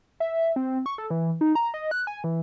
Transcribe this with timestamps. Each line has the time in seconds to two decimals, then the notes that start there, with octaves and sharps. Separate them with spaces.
0.20 E5
0.56 C4
0.86 C#6
0.98 A4
1.10 E3
1.41 D#4
1.55 A#5
1.74 D#5
1.91 F#6
2.07 G#5
2.24 E3